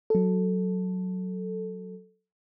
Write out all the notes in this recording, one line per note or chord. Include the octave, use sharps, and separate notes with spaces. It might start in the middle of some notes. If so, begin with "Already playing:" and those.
F#3 A4